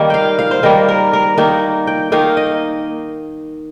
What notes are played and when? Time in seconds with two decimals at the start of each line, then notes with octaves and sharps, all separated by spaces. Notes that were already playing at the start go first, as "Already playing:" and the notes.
Already playing: D#3 G3 A#3
0.10 F5 G5
0.39 F5
0.51 C5
0.63 D#3 G3 A#3 A#4
0.88 A#4
1.13 A#4
1.38 D#3 A#3 D#4
1.87 G5
2.12 D#3 A#3 D#4 F5
2.37 D#5